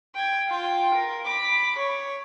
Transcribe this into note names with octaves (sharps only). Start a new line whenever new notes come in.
G5 G#6
F4 G5
A#4
B5 D6
C#5